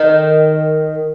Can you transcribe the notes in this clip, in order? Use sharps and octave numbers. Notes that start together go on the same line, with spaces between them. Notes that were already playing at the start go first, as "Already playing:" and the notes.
Already playing: D#3